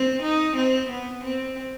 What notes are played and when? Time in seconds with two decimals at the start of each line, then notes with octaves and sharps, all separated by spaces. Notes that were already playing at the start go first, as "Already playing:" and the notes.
Already playing: C4
0.23 D#4
0.56 C4
0.90 B3
1.24 C4